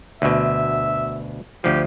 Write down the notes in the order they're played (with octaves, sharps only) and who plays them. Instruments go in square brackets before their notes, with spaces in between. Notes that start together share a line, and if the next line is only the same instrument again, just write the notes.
[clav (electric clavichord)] D2 B2 [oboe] E5
[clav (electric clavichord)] D2 F3 [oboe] G4